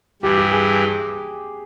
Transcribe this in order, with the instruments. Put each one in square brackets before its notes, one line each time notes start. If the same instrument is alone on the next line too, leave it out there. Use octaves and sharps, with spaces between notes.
[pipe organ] G2 E3 G3 [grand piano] G4
[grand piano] G4
G#4